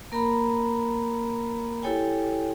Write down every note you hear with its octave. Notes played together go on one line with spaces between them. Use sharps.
A#3 A#4 A#5 B5
E4 G4 A4 C#5 G5 G#5